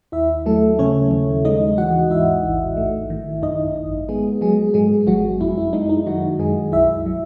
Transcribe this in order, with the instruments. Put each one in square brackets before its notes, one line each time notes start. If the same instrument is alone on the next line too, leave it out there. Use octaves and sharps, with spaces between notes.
[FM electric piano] D#2 E4 E5
F#3 A3 A4
C#3 C#4 C#5
D#2
G#3 D#4 D#5
E3 F#4 F#5
G#2 E4 E5
A1
A3
D#3
F#2 D#4 D#5
G#1
G#3 B3 G#4
F#3 G#3 G#4
G#2 G#3 G#4
G#1 F#3 F#4
F#2 E4
E4
G#3 D#4
D#4
D#3 F#3 F#4
F#2 G#3 G#4
B1 E4 E5
F#3